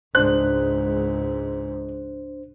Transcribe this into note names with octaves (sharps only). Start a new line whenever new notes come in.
C#2 G#2 D4 C5 F#6